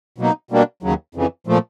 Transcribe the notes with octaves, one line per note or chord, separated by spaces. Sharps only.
B2 F#3 A#3 D#4
B2 G3 A#3 D4
D#2 C#3 F#3
F2 C#3 E3
A#2 F3 A3